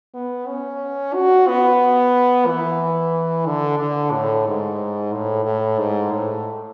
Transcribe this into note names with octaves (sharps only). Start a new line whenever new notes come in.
B3
C#4
F#4
B3
E3
D3
D3
A2
G#2
A2
A2
G#2
A2